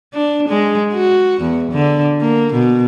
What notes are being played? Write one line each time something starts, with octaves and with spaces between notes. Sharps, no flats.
D4
G#3
F#4
E2
D3
A#3
B2